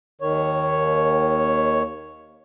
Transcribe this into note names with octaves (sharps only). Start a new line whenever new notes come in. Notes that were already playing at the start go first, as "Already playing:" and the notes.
D#2 D#3 C#5